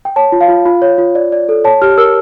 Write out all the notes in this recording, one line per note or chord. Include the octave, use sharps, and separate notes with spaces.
G5
C#5 A5
F4
F5
F4
F4
C#5
F4
D5
D5
A4
C#5 A5
G4 F6
A#4 E6